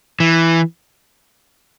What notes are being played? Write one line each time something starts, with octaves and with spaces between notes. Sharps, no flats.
E3